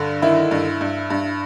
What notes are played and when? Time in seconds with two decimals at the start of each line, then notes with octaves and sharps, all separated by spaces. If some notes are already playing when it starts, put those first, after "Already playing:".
Already playing: G2 D3
0.22 D#3 E4
0.51 G2
0.81 G2
1.10 G2